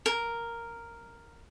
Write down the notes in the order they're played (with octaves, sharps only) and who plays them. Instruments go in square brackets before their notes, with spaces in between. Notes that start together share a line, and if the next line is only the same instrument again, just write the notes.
[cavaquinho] A#4